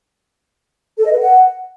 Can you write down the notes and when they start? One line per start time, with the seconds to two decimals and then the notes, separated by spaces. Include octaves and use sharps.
0.98 A4
1.05 D#5
1.11 B4
1.18 F#5